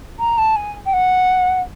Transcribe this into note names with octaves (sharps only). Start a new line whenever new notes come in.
A#5
A5
G#5
G5
F#5